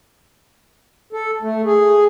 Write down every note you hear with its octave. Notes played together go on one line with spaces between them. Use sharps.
A4
A3
G#4